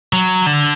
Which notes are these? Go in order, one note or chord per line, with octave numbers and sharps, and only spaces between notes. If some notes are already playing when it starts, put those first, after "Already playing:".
F#3
D3